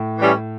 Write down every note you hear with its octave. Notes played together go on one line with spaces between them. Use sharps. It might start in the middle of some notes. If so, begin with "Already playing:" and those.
Already playing: A2
E3 G3 C#4